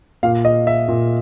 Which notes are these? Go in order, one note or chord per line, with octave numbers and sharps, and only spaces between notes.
A#2 F5
D#5
E5
A#2